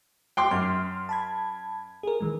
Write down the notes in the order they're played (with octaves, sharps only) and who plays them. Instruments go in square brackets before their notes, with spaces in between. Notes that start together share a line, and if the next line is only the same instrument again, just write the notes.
[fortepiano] G5 C6 D6
[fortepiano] F#2 [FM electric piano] C6 F6
[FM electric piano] A5 B5 G#6
G#4 A#4
D#3 E3 G#3